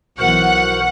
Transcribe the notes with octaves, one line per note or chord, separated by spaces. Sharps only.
B1 E3 F#4 A#4 C5 F#5